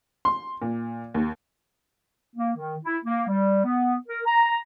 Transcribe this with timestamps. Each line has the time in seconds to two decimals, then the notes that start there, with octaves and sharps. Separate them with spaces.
0.25 C6
0.62 A#2
1.14 D#2
2.36 A#3
2.56 D#3
2.84 E4
3.05 A#3
3.28 G3
3.64 B3
4.08 A#4
4.26 A#5